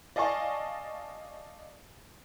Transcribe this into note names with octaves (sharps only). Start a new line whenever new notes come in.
D5 D#5 F5 G#5 A5 C#6